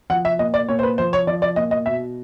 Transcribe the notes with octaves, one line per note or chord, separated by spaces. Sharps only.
F3 F#5
E5
A#2 D#5
D5
A#2 C#5
C5
B4
F3 C5
C#5
F3 D5
D5
A#2 D#5
D#5
B2 E5